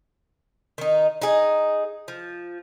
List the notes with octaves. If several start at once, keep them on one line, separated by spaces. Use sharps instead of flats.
D#3 D#4
D#4 G#4
F3